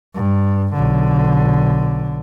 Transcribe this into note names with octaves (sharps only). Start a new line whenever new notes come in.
G2
B1 D3